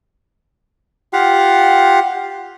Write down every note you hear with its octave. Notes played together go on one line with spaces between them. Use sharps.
F4 G4 F5 F#5